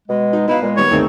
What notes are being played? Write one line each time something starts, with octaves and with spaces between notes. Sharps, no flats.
B2 G#3
D#4
B3 D#4 E4 B4 F5
A#2 G#3
D#3 G3 B3 C#5
D2 G#2 D#3 C4